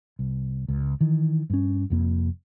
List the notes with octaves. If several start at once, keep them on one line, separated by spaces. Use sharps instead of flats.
C2
C#2
D#3 E3
G2 C#4
F1 F2 A#3